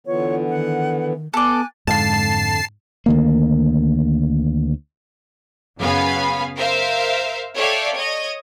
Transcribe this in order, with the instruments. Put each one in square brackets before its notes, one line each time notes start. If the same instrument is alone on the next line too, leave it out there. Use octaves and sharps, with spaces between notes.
[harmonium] D3 E3 B3 [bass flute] F4 [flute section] C#5
[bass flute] D#3 [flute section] F#5
[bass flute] B3 [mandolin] A4 D5 [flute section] G#5 D6 F#6
[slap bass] F2 D3 [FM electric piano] G#2 [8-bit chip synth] A5 C7
[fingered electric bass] D2 D#3 A#3
[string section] F#2 C#3 B3 F5 G#5 B5
A#4 C5 E5 F5
A4 C#5 D5 E5 F5 G5
C#5 D#5